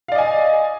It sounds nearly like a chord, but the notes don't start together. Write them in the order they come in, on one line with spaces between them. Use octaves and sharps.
F5 D5 D#5 G#5